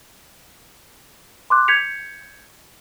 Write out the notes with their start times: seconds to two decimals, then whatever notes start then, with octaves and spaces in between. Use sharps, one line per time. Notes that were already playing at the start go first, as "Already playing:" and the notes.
1.50 C6 D6 F#6
1.68 G6 G#6 B6 C#7 F7